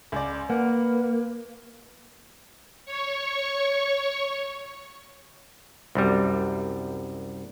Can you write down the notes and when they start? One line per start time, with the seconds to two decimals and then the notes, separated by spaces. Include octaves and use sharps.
0.12 C#2 D5
0.50 A#3 B4 F#5
2.86 C#5 C#6
5.95 C2 F#2 G3